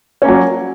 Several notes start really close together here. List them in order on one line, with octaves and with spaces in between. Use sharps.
C#4 A#3 F#3